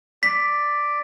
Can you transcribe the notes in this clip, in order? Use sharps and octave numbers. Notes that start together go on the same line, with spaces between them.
D5 B6